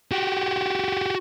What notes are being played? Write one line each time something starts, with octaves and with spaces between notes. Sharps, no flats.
F#4 G4